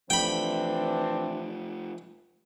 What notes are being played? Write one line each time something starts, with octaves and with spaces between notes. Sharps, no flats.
E3 F3 A3 C4 D4 G5 B5